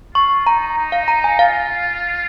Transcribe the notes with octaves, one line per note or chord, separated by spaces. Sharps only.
F4 C#6
D#4 A#5
D#4
F5
A#5
G#5
F4 F5